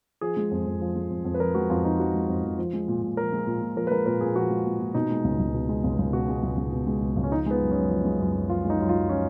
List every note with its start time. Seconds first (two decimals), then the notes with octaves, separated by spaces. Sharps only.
0.21 F3 G#4
0.37 G#3
0.51 F2
0.66 F2
0.81 F3
0.96 G#3
1.10 F2
1.25 F2
1.34 B4
1.40 F3 A#4
1.55 G#3 F#4
1.70 F2 F4
1.85 F2 D#4
1.99 F3 F#4
2.14 G#3
2.28 F2
2.44 F2
2.59 F3
2.73 G#3
2.88 A#2
3.02 A#2
3.17 F3 A#4
3.32 G#3
3.47 A#2
3.62 A#2
3.76 F3 A#4
3.87 B4
3.91 G#3 A#4
4.06 A#2 A#4
4.21 A#2 G#4
4.36 F3 F#4
4.51 G#3
4.65 A#2
4.80 A#2
4.94 B2 D#4
5.10 G#3
5.24 C#2
5.39 C#2
5.54 B2
5.69 G#3
5.84 C#2
5.99 C#2
6.13 B2 F#4
6.28 G#3
6.43 C#2
6.57 C#2
6.72 B2
6.87 G#3
7.02 C#2
7.17 C#2
7.24 C#4
7.32 F3 D#4
7.46 G#3 B3
7.61 F#2
7.71 F#2 C#4
7.90 F3
8.05 G#3
8.20 F#2
8.35 F#2
8.49 F3 F4
8.65 G#3
8.70 D#4
8.79 F#2
8.89 F4
8.94 F#2
9.08 F3 C#4